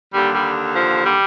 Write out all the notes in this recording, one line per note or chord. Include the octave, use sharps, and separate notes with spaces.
D#2 D3 G3
G3
F3
G3